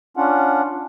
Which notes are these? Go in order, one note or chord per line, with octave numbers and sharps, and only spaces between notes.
C#4 D4 F4 F#5